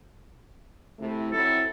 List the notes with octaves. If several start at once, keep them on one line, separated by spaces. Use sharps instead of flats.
C3 A3 E4
F#3 C4 E4 A4